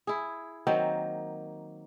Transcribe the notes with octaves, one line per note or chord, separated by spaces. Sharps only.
E4 G#4
D#3 F#3 A#3 C4